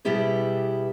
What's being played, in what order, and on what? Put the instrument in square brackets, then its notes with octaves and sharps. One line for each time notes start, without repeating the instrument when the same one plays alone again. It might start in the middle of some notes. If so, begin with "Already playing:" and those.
[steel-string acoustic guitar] B2 G3 B3 E4 G4 G#4